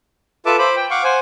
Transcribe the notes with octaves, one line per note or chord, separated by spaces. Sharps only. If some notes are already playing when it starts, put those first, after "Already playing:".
F4 A4 B4 E5 A5 D6
C5 B5 D6
G5
F5 F#5 C#6 D6
C5 F#5 G#5